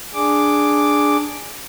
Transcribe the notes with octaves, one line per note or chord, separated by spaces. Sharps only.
D4 G#4 D6